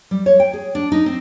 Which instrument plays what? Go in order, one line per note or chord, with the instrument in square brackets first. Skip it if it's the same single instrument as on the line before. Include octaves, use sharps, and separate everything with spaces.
[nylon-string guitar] G3
C#5
G5
G#4
D4
D#4
C4